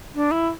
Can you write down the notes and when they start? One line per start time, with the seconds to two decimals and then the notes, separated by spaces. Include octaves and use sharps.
0.15 D4
0.31 E4